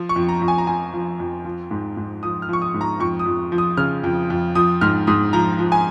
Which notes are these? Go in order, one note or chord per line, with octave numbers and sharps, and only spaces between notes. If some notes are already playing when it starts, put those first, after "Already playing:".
Already playing: F3
C#6
F2
A#5
F2
G#5
A#5
F3 G#5
F3
F2
F3
G#2
G#2
F3 D#6
F6
F3 C#6
D#6
G#2
A#5
F2 C#6
D#6
F2
F3
D#6
C#3 F6
F2
F2
F3 D#6
G#2 F6
G#2 D#6
F3 A#5
F3
G#5